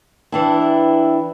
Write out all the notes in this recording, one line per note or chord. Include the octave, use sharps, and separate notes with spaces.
E3 D4 E4 G5 A5 E6
E5 G5